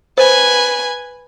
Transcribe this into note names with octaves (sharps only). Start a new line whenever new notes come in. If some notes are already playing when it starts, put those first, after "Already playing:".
B4 C5 G#5